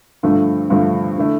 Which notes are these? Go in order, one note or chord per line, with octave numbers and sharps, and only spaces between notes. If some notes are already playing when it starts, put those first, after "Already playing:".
G2 D3 F3 A3
G2 D3 F3 A3
D3 A3 E4